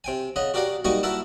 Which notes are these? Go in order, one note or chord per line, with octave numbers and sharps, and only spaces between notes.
C3 G5 G#5
C#3 D#5 F#5
F#4 G4 A#4 D5 F5 F#5
G3 A#3 D#4 F#4 D#5 C#6
E4 A4 A#4 E5 F#5 A5